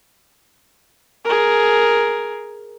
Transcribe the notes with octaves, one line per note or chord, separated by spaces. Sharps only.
G#4 A#4